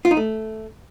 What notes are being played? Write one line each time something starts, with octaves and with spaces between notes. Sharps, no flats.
F4
D#4
A3